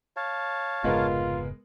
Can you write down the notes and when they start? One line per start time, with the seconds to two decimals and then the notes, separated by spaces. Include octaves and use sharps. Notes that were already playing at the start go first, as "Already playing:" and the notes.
0.16 C#5 F5 A5
0.84 F1 G#2 C#3 G#3 B3 F4 A#4